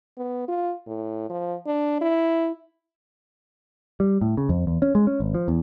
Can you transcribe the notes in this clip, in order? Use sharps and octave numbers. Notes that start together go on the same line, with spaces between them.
B3
F4
A2
F3
D4
E4
G3
A2
C#3
F2
E2
C#4
G#3
C#4
G#1
F3
E2